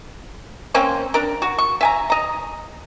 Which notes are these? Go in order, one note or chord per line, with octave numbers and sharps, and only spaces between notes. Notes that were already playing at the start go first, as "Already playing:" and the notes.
A#3 C4 C#4 C5
D4 A#4
F#4
C#6
E5 G#5 A#5
D#5 A#5